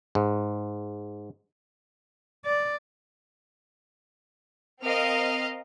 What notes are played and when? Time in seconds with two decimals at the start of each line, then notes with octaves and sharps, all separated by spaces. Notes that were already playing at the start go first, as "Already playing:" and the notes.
0.15 G#2
2.45 D5
4.82 C4 A#4 D#5 F5 F6